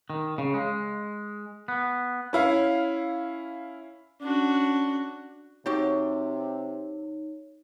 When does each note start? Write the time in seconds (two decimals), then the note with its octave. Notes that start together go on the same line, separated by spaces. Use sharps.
0.10 D#3
0.38 C#3
0.54 G#3
1.68 B3
2.33 C#4 E4 F5
4.21 C#4 D4 F#4
5.66 C3 D#4 F#4 G4 C#5